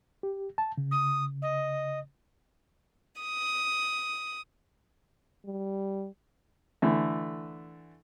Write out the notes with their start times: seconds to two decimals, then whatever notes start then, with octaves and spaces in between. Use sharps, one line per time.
0.23 G4
0.58 A5
0.78 C#3
0.91 D#6
1.42 D#5
3.20 D#6
5.46 G3
6.82 D3 E3 A3